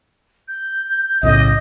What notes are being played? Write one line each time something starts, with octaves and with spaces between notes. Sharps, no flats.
G6
B1 A2 C#3 D#5